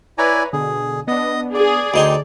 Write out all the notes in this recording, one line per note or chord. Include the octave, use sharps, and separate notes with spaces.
E4 B4 C#5 D5 G#5 A#5
B2 D3 G#4
B3 D4 D#5
G#4 D5
D2 D#4 G5 C6 D6